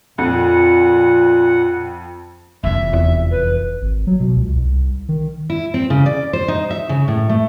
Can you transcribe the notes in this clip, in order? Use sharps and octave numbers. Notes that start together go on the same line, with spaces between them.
F2 A#2 F#5
F1 E3 E5
E2
B4
G#1
F#3
B2
C#2
C2
D#3
E4
C4
C#3
D5
C5
D#4
E5
C#3
A2
A3